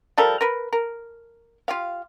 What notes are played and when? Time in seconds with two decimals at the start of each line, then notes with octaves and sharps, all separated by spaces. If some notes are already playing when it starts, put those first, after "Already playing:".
0.18 F3 G3 A4 A#4
0.41 A#4 B4
0.73 A#4
1.68 F4 G4 F5